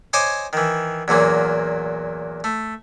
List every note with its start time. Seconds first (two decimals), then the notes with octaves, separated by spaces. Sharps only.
0.13 C5 C#5 D#5 G#5 C6 D6
0.53 D#3 E3
1.08 E2 A#2 F#3 A#3
2.44 A3